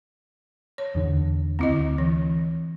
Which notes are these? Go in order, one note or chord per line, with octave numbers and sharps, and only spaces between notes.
C#5
E2 D3
D2 C4 E4 D#5
E3